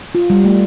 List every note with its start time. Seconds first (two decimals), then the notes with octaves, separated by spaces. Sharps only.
0.15 F4
0.30 G3
0.44 A3